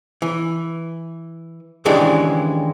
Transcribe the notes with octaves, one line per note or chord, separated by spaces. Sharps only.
E3
D#2 C#3 E3 G#3 D4 G4